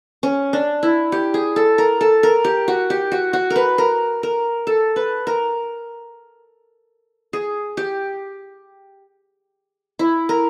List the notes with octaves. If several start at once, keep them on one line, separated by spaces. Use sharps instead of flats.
C#4
D4
E4
G4
G#4
A4
A#4
A4
A#4
G4
F#4
G4
F#4
F#4
A#4
B4
A#4
A#4
A4
B4
A#4
G#4
G4
E4
A#4